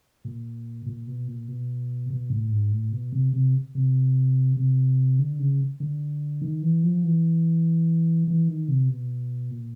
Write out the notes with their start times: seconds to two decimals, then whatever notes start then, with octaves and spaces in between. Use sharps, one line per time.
0.25 A#2
0.86 A#2
1.07 B2
1.28 A#2
1.48 B2
2.10 B2
2.30 A2
2.51 G#2
2.72 A2
2.92 B2
3.12 C3
3.33 C3
3.75 C3
4.57 C3
5.19 D3
5.39 C#3
5.80 D3
6.42 D#3
6.62 E3
6.84 F3
7.04 E3
8.28 E3
8.48 D#3
8.68 C3
8.89 B2
9.50 A#2